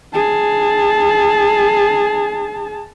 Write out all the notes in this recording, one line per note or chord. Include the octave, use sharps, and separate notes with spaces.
G#4 A5